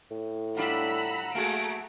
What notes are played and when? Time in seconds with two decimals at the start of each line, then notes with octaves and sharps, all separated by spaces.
0.11 A2
0.57 G3 D4 F4 F#5 A#5 B5 E6 B6
1.35 A3 A#3 F#4 G#4 D7